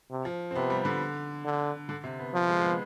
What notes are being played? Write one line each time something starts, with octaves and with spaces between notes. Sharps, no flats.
C3
F3
C4
C3 B3
G3
D3
D3
D3
C3
B3
F3
G#3
G#3
B3